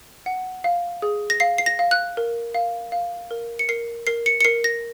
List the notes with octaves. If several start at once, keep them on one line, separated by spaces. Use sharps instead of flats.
F#5
F5
G#4
A#6
F5 C7
C7
A#6
F5
F#6
A#4
F5
F5
A#4
C#7
A#4 C7
A#4 C7
C#7
C#7
A#4 C7
A#6